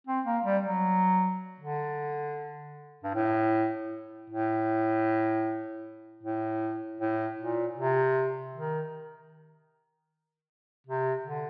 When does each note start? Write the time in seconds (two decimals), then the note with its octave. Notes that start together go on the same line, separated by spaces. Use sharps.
0.07 C4
0.25 A#3
0.45 G3
0.64 F#3
1.60 D3
3.03 G2
3.14 A2
4.30 A2
6.23 A2
7.00 A2
7.39 A#2
7.78 C3
8.55 D#3
10.87 C3
11.24 D3